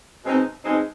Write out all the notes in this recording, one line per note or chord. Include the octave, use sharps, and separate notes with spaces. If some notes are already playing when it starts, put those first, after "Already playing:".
B2 G#3 C4 D#4
B2 G#3 C4 D#4